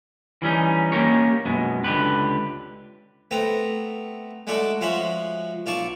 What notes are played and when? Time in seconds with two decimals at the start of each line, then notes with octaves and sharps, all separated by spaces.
0.42 E3 G3 C#4 D#4
0.92 A#3 C#4 F4 G4 A#4 C#5
1.46 F#2 B2 G#3
1.84 C#2 D3 G4 B4
3.31 A3 B3 C4 A#5
4.47 G#3 A3 D4 F#4 A4 D6
4.81 F3 G#3 C#4 F#4 E5 C6
5.66 B1 F4 D5 A5 C#6